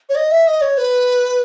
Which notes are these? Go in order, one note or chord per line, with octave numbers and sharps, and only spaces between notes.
C#5
D#5
E5
D#5
C#5
B4